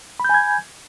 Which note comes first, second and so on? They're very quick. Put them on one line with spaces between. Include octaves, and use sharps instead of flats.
B5 G6 G#5 G#6